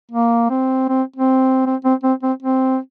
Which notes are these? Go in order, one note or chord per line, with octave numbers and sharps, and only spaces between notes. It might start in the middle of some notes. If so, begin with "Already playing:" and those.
A#3
C4
C4
C4
C4
C4
C4
C4
C4